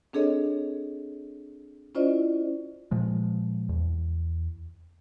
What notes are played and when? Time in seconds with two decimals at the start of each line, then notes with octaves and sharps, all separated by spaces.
0.13 C4 D4 G#4 A4 C#5 D#5
1.95 C#4 E4 F4 C5 D5 D#5
2.91 A#2 F3 G#3
3.69 E2